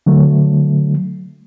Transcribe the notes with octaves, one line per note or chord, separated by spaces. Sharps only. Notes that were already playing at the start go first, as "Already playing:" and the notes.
D3 F#3 A3